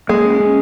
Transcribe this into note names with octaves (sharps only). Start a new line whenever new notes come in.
G#3 A#3
C#4
C#4